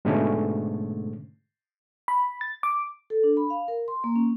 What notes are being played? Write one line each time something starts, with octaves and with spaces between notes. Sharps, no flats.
G#2 B2 D3 G#3 A3 C#4
B5
A6
D6
A4
D4
B5
F5
A#4
C6
A#3
C#4